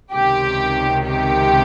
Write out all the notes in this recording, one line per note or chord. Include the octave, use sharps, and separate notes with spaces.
C#2 C3 D#3 G4
G4